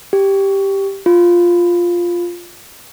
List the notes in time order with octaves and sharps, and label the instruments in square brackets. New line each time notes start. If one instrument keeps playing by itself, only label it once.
[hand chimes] G4
F4